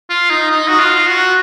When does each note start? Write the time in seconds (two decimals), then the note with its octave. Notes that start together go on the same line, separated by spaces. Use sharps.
0.10 F4
0.30 D#4
0.51 D#4
0.68 F#4
0.80 F4
1.07 F#4